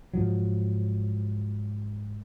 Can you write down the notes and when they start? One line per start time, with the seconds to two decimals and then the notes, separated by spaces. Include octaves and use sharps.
0.14 G#2 F3 F#3